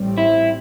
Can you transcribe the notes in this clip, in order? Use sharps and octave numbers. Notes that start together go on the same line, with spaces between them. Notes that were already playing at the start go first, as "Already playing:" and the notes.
Already playing: A1 A2 G3 C4
E4